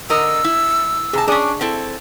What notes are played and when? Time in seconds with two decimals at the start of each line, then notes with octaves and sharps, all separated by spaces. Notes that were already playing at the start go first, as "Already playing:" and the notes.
0.10 D3 A#4 D#5 E6
0.44 E4
1.13 C3 G#4 A5 A#5
1.28 C#4 D4 G#4 D5 D#6
1.61 C4 E4 A4